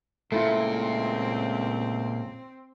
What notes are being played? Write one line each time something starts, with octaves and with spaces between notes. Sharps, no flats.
C#2 A#2 A3 C4 E4 F4